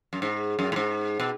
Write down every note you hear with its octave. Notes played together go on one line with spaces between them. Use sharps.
F#2
G#2
F#2
A2
G#2
B2